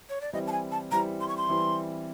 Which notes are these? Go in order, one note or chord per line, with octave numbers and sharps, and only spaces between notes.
C#5
D5
E3 G3 C4 E4 D#5
A5
G#5
A5
E3 G3 C4 E4 A#5
C6
C#6
C6
E3 G3 C4 E4